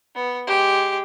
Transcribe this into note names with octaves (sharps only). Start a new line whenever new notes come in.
B3
G#3 G4